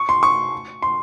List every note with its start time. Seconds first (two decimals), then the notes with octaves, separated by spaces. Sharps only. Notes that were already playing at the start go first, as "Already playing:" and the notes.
Already playing: C#6
0.09 C6
0.23 C#6
0.82 C6